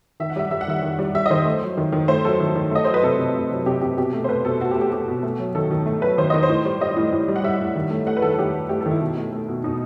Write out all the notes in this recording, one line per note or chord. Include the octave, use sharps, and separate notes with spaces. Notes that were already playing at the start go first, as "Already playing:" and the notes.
D#3 E5
F#5
G3 E5
G3 E5
F#5
D#3 E5
D#3
G3
G3 E5
D#5
D#3 C5
A3
F#3
D#3
D#3
A3 C5
F#3 A4
D#3
D#3
A3 D#5
F#3 C5
B4
C3 A4
C3
A3
F#3
C3 G4
C3 G4
B2 G4
A3
C5
A3 B4
B2 A4
B2 F#4
G4
A3
G4
A3 G4
B2
A3
F#3
D#3 A4
D#3
A3
F#3 B4
D#3 C5
D#3 D#5
C5
A2
G3
G3 D#5
A2
A2
G3
F#5
G3 E5
A2
D#3
A3
A3 F#5
B4
D#3 A4
A4
D#3 G4
A3
A3 G4
A4
D#3
E4
B2
A3
A3
B2
B2 D#4